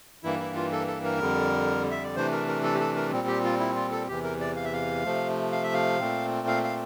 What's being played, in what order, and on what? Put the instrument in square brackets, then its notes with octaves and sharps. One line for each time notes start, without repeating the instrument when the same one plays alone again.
[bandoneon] G2 E3 A#3 E4
E4
F4
A4
A4
A#4
F2 D3 G3
E5
D5
C3 E3 A3 D4 C5
A#4
A#4
A4
G4
A4
A#4
A#2 G3 C4
G4
F4
E4
F4
A4
E2 C3 E3 G4
A#4
D5
F5
E5
F5
C3 F3 A3
F5
E5
F5
A#2 A3 C4
F5
F5